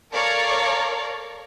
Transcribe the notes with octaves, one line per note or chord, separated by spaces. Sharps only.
A4 A#4 C#5 D5 F5 A#5